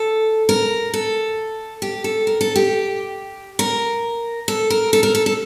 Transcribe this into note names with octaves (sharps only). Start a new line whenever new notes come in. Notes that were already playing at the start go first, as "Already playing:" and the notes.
Already playing: A4
A#4
A4
G4
A4
A#4
A4
G4
A#4
A4
A#4
A4
A#4
A4
A4